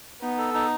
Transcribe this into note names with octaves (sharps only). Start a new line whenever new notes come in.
B3 D#4
A4
D#4